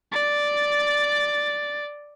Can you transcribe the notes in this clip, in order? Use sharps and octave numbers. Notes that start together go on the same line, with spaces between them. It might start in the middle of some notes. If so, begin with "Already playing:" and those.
D5 A6